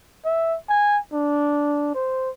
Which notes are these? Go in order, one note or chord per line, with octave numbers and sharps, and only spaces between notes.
E5
G#5
D4
C5